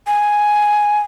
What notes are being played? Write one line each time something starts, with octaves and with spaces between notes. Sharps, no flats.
G#5